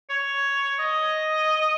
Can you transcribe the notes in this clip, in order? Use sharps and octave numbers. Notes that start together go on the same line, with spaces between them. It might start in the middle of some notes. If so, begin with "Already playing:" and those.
C#5
D#5